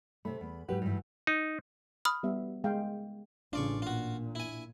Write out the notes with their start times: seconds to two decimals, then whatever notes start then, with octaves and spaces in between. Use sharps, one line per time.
0.25 C3 A3 B5
0.41 E2
0.68 G#2 F#3 G4 B4 F#5
0.82 G2 E3
1.27 D#4
2.05 B5 D#6 F6
2.23 G3 B3 E5
2.64 G#3 F5 G5
3.53 A1 C#3 D4 F4 D5 C#6
3.82 A#2 F4 F#4
4.35 E4 G#5